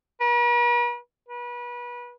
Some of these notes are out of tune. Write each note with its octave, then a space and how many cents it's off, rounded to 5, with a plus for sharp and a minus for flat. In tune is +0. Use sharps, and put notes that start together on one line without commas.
B4 -45
B4 -30